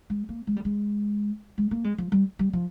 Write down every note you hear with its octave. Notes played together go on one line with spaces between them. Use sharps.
G#3
A#3
G#3
G3
G#3
G#3
A#3
G#3
F3
G3
G3
F3